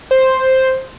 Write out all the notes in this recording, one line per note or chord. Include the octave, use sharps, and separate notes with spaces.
C5